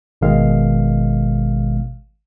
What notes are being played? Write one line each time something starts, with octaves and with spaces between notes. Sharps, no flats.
G#1 B2 D#3 G#3 F5